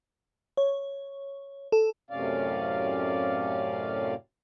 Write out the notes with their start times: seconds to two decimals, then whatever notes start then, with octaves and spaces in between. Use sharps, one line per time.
0.57 C#5
1.72 A4
2.11 F#2 A2 C3 C#4 D5 F5